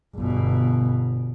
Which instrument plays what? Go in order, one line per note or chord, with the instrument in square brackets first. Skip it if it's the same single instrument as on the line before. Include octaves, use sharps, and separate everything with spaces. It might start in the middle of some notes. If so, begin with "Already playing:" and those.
[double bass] G1 B2